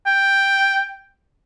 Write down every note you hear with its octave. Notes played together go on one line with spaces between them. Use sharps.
G5